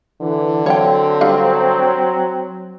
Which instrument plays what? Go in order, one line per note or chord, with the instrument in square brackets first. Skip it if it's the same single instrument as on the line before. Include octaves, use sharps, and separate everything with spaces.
[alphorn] D3 [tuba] E3
[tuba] F#3 [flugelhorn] C4 [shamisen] C#5 F#5 G5
[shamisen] G3 D4 F5